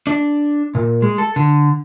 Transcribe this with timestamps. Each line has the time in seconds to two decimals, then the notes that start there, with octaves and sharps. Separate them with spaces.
0.07 D4
0.75 A#2
1.02 G#3
1.18 A4
1.36 D3